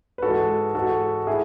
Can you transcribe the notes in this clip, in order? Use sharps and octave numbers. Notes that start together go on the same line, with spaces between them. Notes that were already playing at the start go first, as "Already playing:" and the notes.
B4
G#2 E3 G#3 F#4 A4
G#2 E3 G#3 F#4 A4
A2 E4 G#4